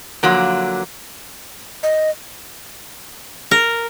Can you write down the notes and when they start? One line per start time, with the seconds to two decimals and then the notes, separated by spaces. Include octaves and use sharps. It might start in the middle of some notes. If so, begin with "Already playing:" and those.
0.23 D3 F3 F#3 A#3
1.83 D#5
3.51 A#4